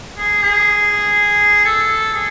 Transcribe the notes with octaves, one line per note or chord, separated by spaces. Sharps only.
G#4
G#4
A4
G#4